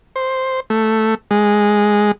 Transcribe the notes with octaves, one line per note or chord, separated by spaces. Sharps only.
C5
A3
G#3